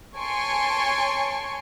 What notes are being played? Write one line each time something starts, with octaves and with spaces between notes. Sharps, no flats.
C#5 G#5 A5 C6 C#6 D7